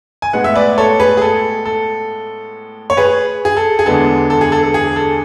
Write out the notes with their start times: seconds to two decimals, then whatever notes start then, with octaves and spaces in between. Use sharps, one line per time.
0.22 G#5
0.33 A2 G#3 B3 F#5
0.44 E5
0.56 B4 D5
0.78 A4 C#5
1.00 G#4 B4
1.17 G#4
1.22 A4
1.65 A4
2.90 C#5
2.97 G#4 B4
3.45 G#4
3.57 A4
3.79 G#4
3.86 E2 D3 G#3 B3 A4
4.30 A4
4.41 G#4
4.52 A4
4.63 A4
4.74 G#4
4.96 A4